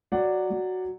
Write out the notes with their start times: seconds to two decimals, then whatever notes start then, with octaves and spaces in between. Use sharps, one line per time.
0.12 F#3 D5 F#5
0.50 F#3